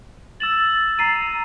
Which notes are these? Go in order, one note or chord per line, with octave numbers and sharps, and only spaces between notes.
E6 A6 E7 F#7
A#5 C7 D#7